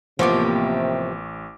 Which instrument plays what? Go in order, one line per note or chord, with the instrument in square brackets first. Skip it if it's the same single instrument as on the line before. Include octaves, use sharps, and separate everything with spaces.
[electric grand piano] A1 C#6 D6 [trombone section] C3 [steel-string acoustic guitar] F3 G4 [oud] A#3 B3